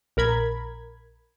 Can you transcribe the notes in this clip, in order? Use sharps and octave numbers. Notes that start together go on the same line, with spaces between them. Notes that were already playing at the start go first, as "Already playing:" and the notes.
A#1 A#4 B5 G#6